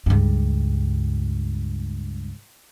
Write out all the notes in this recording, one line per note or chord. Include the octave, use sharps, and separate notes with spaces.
C#2 G2